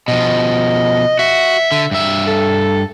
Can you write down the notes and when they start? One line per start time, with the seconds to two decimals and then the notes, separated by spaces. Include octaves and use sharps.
0.08 B2 F3 D#5
1.19 F#4 E5
1.72 D3
1.91 G2 E5
2.27 A4